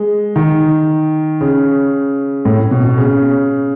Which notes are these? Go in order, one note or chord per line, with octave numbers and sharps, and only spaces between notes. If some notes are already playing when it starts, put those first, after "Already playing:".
Already playing: G#3
D#3
C#3
A2
B2
B2
C#3